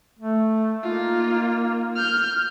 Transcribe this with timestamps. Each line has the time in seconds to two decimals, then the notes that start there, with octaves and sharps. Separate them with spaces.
0.19 A3
0.83 A#3 D#4 F4
1.95 F6 G6